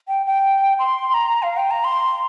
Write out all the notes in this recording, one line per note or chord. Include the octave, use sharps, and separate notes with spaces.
G5
G5
C6
A#5
F5
G5
A#5
C6